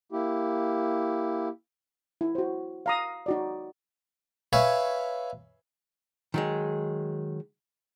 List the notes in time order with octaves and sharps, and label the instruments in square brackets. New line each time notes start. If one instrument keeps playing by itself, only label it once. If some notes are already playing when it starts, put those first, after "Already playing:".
[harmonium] A#3 E4 G4
[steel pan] E4
F#4 C5
F5 A#5 D#6
D#4 F#4 D5
[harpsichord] B4 C#5 E5 F5 G#5
[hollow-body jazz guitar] D#3 F#3 G#3